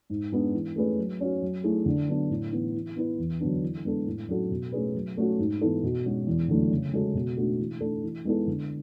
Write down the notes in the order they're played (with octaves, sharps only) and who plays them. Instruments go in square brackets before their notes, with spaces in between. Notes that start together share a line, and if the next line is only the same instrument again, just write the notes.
[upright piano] G#2
G#3 B3 D4
E3
A3 C#4 G#4 B4
F#3
C#4 F#4
F#3
A3 E4 G#4
D3
F#3 B3 D4
A2
E3 B3 E4
E3
B3 E4 B4
E2
D3 F#3 B3 D4
E3
G#3 B3 D4 A4
A2
F#3 C#4 F#4 A4
B2
A3 C#4 G#4 B4
F#3
A3 C#4 F#4 A4
G#2
E3 B3 E4 A4
B2
G#3 C#4 F#4
E2
D3 F#3 A3 E4
C#3
G#3 C#4 F#4 A4
B2
A3 D4 F#4
E3
A3 D4 A4
E3
G#3 B3 E4 A4
D3